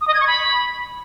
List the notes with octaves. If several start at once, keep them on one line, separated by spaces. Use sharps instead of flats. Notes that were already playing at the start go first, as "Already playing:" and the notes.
D#6
D#5
G#6
C#6
B5